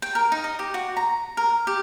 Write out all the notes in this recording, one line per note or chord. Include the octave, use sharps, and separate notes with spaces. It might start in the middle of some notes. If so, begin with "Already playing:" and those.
G5
A#4
D#4
D#5
G4
F#4
A#5
A#4
G4